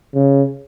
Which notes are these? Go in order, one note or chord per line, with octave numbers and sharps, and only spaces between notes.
C#3